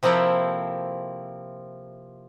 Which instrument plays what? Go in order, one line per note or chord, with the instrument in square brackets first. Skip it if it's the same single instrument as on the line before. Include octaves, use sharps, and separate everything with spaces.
[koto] C3 F3 A#3 C4 E4 A4